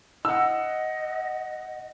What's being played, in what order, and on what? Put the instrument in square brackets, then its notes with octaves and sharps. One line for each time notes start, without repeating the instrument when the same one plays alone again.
[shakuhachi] D#5 [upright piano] F#5 E6